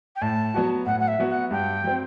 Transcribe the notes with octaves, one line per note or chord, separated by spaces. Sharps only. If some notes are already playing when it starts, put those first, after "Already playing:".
G5
A2 A5
F#3 B3 F#4
A2 F#5
F#5
E5
F#3 B3 F#4
F#5
G2 G5
F#3 C4